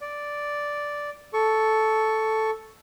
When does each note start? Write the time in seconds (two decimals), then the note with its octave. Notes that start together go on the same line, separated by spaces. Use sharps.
0.01 D5
1.33 A4 C#6